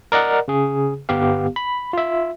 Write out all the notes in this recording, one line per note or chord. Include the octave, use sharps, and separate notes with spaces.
A#4 D5 D#5 F#5
C#3 G#4
G1 B3 G4 F5
B5
F4 E5